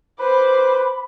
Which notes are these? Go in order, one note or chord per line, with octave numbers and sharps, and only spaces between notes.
B4 C5 B5 D6